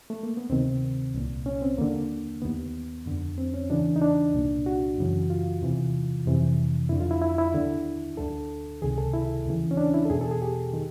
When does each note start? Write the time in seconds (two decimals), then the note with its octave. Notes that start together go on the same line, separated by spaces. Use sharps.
0.10 A3
0.23 A#3
0.37 B3
0.50 D2 C3 D#3 C4
1.14 C2 A#2
1.46 C#4
1.62 C4
1.78 D#2 D3 A#3
2.42 D#2 D#3 B3
3.06 F2 D3
3.38 C4
3.54 C#4
3.70 E2 C#3 E3 D4
3.96 D#4
4.02 D4
4.34 C2 A#2
4.66 F#4
4.98 F#2 C#3 E3
5.30 F4
5.62 E2 C3 E3
6.26 F2 C3 E3
6.89 F2 D3 E4
7.00 F4
7.11 E4
7.22 E4
7.38 E4
7.54 D#2 D3
8.17 D2 D3 A4
8.82 C#2 C3 D#3 G#4
8.98 A4
9.14 E4
9.45 D#2 C#3 E3
9.71 C#4
9.77 D4
9.94 E4
10.05 A4
10.10 E2 B2 G#4
10.21 A4
10.31 G#4
10.42 G4
10.74 D#3